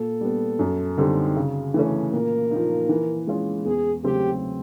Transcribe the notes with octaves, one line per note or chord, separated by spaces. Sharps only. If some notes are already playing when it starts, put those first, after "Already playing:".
Already playing: A#2 A4
G3 B3
F#2
D3 G3 C4 D#4
C#3
E3 A3 C#4
A#2 A#4
F3 A#3 D#4
E3
G#3 C#4 F4
E2 G#4
C#3 F#3 A3 C4 G4